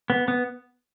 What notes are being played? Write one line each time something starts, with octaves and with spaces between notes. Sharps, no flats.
B3
B3